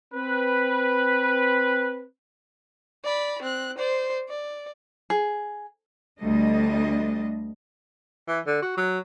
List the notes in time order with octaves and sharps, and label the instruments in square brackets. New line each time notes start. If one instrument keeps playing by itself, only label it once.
[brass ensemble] C4 B4
[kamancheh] D5 B5
C4 F#6
C5 D5
D5
[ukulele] G#4
[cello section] D2 G3 A3 D4 D#5
[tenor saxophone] E3
D3
F#4
F#3